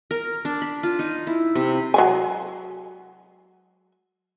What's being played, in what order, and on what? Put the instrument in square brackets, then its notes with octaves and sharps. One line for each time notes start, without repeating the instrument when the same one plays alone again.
[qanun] A#4
D4
B5
F4
D#4
E4
C3
[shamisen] F#3 G#3 G#5